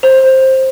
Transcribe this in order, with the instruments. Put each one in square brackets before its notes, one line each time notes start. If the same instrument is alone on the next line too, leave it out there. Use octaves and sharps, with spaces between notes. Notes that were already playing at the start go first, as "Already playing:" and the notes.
[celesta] C5